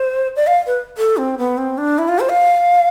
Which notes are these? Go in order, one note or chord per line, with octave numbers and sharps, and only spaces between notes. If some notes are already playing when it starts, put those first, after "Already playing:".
Already playing: C5
D5
F5
B4
A4
C4
B3
C4
D4
E4
F4
C5
F5